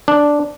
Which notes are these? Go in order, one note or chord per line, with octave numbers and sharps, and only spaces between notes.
D4